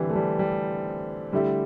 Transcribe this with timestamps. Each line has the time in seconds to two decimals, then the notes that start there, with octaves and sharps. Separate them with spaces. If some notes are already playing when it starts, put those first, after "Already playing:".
Already playing: D3 E3 G3 C4 G4
0.10 A3
0.15 G3
0.39 G3
1.32 D3 G3 A3 E4 G4